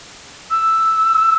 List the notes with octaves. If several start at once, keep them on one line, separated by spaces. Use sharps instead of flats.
E6